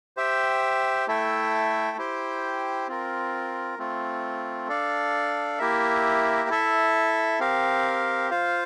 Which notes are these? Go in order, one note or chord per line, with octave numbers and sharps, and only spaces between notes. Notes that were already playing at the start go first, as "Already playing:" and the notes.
G4 C5 E5 G5
A3 E4 A4 E5 G5
E4 G4 C5 G5
C4 F4 A#4
A3 C4 F4
D4 A4 D5 F5
A#3 E4 G4 A#4 E5
E4 A4 E5
C4 G4 A#4 F5
F4 C5 F5